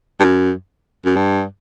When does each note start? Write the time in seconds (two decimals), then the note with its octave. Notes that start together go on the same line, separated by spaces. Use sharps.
0.20 G2
0.24 F#2
1.05 F#2
1.16 G2